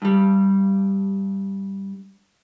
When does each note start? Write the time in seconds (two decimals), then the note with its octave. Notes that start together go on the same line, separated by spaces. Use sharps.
0.02 G2 G3